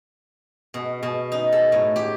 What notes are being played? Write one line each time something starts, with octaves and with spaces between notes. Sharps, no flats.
B2
B2
D#4
A4
A2
G4